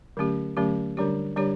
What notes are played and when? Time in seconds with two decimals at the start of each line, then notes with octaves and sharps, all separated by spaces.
0.17 D3 F#3 A3 C#4 G4
0.57 D3 F#3 A3 C#4 G4
0.97 D3 G3 D4 G4 C#5
1.36 D3 G3 D4 G4 C#5